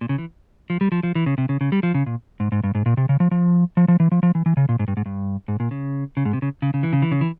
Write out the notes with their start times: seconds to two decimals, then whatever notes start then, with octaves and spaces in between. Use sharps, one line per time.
0.01 A#2
0.09 C#3
0.18 E3
0.70 F3
0.81 G3
0.92 F3
1.03 F3
1.15 E3
1.26 C#3
1.38 C3
1.49 C#3
1.61 C#3
1.72 G3
1.83 F3
1.94 C#3
2.06 A#2
2.40 G#2
2.52 G#2
2.64 G2
2.75 G#2
2.86 A#2
2.97 C3
3.09 C#3
3.20 F3
3.31 F3
3.77 F3
3.88 F3
4.00 E3
4.12 F3
4.23 F3
4.35 E3
4.46 E3
4.57 C#3
4.69 A#2
4.79 G#2
4.88 G2
4.97 G#2
5.06 G2
5.48 G#2
5.60 A#2
5.71 C#3
6.17 C#3
6.25 G#2
6.33 C3
6.42 C#3
6.62 C#3
6.74 C#3
6.83 E3
6.93 C#3
7.02 E3
7.11 C#3
7.21 E3